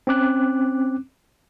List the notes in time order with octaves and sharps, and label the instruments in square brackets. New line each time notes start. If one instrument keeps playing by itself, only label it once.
[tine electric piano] C4 C#4 D6 F#6